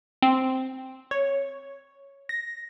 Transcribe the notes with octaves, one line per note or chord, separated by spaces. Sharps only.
C4
C#5
A#6